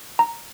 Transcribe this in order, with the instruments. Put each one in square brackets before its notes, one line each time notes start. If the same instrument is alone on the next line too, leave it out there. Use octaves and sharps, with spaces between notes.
[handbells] A#5